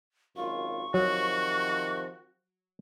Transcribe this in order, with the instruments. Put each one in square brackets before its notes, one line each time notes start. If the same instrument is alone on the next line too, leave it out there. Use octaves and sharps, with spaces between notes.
[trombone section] G#1 F#2 F4 [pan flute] C#6
[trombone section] C3 D#3 F3 [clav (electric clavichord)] F#3 [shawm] F#4